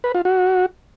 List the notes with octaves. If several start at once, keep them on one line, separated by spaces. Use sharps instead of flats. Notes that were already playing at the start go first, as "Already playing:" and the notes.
B4
F4
F#4